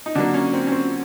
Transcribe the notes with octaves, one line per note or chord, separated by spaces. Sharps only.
D#4
D3 F#3 A#3 D4
C#4
C4
C#4
C4